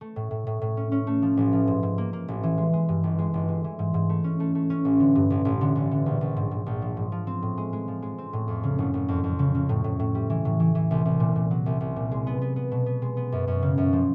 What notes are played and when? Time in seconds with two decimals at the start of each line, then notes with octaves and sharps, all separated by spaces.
0.01 A3
0.16 A2
0.31 A2
0.47 A2
0.62 A2
0.77 C#4
0.92 C#4
1.07 A3
1.22 F3
1.37 A1
1.53 F3
1.67 G#2
1.83 G#2
1.98 A#3
2.13 A#3
2.28 A1
2.43 E3
2.58 G#3
2.73 G#3
2.89 G2
3.04 G1
3.19 G#3
3.34 G1
3.48 G#3
3.64 E3
3.79 G#2
3.94 G#2
4.09 A3
4.24 C#4
4.40 A3
4.55 A3
4.70 C#4
4.85 A1
5.00 D3
5.16 G2
5.30 A1
5.45 A1
5.61 D3
5.76 A1
5.91 D3
6.06 A#1
6.21 A#1
6.37 G#2
6.51 G#2
6.66 A#1
6.82 F3
6.97 G#2
7.12 F3
7.27 C4
7.42 A2
7.57 G#3
7.73 G#3
7.88 F3
8.02 G#3
8.18 C4
8.33 A2
8.48 F2
8.63 C#3
8.79 F#1
8.94 F#1
9.08 F2
9.24 F2
9.39 C#3
9.55 C#3
9.69 A2
9.84 A2
10.00 A2
10.15 G3
10.30 E3
10.45 A2
10.60 E3
10.75 E3
10.91 C2
11.05 C2
11.20 A#2
11.36 A#2
11.51 F#3
11.66 C2
11.81 C2
11.96 A#2
12.12 G#3
12.27 B3
12.42 B3
12.56 B3
12.72 B2
12.86 B3
13.02 G#3
13.17 B3
13.32 F#2
13.47 F#2
13.62 C#3
13.78 F#2
13.93 F3